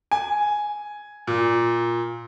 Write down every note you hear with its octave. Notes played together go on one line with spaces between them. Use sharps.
G#5
A#2